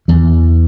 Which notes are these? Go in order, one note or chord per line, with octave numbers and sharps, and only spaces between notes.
E2 E3